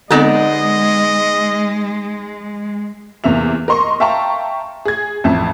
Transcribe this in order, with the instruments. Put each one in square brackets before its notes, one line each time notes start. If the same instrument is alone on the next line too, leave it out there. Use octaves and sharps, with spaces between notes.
[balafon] D3 C4 A4 [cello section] G#3 [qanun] B3 D#4 D5 [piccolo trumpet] D#5
[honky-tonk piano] E2 C3 A#3 E5 F7
A#4 D#5 C6 C#6
E5 F5 G5 A5 A#5 C#6
G#4 G#6
A1 F2 E5 A5